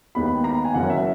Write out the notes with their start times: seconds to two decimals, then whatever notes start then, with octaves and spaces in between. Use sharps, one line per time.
0.15 D#2 D#3 G#3 B3 B5
0.44 A#5
0.65 G#5
0.74 F#1 F#2 C#3 F#5
0.90 E5